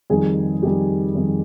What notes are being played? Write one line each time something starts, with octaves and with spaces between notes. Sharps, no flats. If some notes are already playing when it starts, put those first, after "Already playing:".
F2 D#3 G3 G#4
F2 D#3 G3 G4
F2 D#3 G3